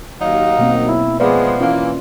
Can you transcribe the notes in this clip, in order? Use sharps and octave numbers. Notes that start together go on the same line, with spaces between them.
D#2 F#3 D#4 F5
B2 A#3 C4
E4
F3 G#3 B3 B4 D5 E5
E3 A#3 C#4 F4